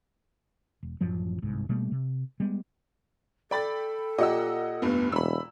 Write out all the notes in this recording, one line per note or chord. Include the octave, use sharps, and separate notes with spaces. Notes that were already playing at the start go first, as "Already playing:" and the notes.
E1
A1 F#2 F3 F#3
G1 C2 G#2
B2 G3 A3 A#3
C3
G3 G#3 B3
A4 D5 G5 B5 A6
A#2 G4 D#5 F#5 E6
F1 G2 B3
E1 B5 E6